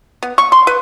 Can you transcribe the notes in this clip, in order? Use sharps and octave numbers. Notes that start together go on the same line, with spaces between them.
B3
C#6
C6
B4